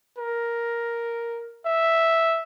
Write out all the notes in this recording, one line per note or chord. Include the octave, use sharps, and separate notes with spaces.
A#4
E5